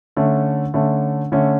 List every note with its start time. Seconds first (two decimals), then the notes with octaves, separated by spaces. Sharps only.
0.17 D3 A3 C#4
0.74 D3 A3 C#4
1.32 D3 A3 C#4